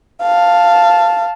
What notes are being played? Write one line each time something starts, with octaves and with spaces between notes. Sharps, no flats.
F5 A5